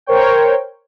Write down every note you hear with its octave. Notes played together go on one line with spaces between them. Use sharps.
A#4 C5 C#5 G5